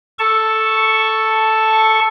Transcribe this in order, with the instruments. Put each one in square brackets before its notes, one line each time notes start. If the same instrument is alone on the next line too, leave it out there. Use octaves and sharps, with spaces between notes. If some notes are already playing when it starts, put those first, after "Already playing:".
[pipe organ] A4 A5 C#6